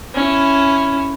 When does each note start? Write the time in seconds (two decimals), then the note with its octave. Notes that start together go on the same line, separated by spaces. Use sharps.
0.14 C#4 E4